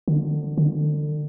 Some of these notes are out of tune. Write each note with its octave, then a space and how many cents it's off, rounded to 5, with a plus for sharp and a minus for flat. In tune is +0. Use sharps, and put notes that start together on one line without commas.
D3 +25
D3 +30